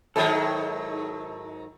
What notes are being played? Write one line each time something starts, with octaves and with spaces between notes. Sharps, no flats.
G#2 D#3 F#3 E4 A4